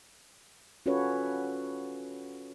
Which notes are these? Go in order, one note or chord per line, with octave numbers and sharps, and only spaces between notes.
C#4 F4 F#4 A4 B4 C#5